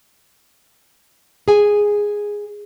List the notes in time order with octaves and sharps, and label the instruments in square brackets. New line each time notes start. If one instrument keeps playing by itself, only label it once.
[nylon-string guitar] G#4 G#5